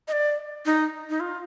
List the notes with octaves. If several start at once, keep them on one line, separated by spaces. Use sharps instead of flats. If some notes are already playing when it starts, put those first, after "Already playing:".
D#5
D5
D#4
D#4
F4